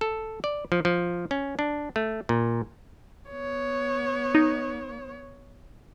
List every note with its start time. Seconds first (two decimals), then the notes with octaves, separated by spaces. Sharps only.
0.01 A4
0.44 D5
0.72 F3
0.85 F3
1.31 C#4
1.59 D4
1.96 A3
2.29 A#2
3.30 B3 C#5
4.35 D#4